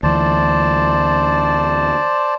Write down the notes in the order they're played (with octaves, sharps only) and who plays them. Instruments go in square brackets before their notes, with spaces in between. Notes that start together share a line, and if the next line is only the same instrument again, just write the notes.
[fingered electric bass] D2 E3 [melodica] C5 D5 A5